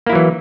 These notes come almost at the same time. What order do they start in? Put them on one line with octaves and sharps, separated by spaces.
A#3 E4 F#3 E3